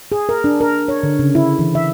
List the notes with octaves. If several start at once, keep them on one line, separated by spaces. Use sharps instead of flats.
G#4
A#4
D4
A#4
C#5
D3
C#3
E4
E3
E5